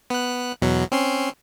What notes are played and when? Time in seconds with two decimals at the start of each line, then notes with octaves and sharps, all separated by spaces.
0.10 B3 F#6
0.62 E2 B2 F#3
0.92 C4 C#4 C6